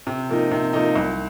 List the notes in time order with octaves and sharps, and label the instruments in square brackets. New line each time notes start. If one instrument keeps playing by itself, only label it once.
[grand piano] C3
F3 A#3 D#4
C3
F3 A#3 D#4
C2